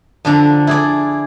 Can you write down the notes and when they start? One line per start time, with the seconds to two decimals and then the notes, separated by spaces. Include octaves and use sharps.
0.25 F2 D3 D4 F5 A#5
0.67 E4 G#4 D5